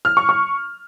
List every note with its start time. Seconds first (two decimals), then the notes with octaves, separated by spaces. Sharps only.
0.05 F6
0.17 C#6
0.29 C#6